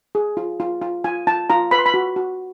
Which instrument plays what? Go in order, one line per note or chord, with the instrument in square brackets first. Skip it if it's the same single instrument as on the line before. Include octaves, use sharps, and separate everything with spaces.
[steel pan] G#4
F4
F4
F4
F4 G#5
F4 A5
F4 A#5
B4 B5
C6
B5
F#4
F#4